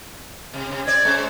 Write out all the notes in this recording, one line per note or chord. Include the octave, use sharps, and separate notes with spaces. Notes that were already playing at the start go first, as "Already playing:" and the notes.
C3
C3
C4 D5 G#6
G#3 C#4 C5